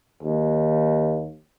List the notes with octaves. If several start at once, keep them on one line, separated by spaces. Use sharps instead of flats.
D#2